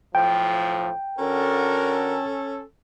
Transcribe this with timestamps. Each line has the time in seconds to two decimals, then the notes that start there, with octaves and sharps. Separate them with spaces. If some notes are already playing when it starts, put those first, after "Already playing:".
0.15 B1 A2 F3 G5
1.19 D3 C#4 F#4 A4 A#4